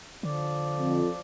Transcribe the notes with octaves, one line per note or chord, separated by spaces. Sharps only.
D3 F3 D5
F2